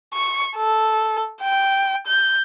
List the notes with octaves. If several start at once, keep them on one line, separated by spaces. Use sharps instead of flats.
C#6
A4
G5
G6